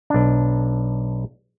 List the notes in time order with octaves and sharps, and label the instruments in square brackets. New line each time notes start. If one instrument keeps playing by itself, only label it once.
[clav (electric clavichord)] B1 D4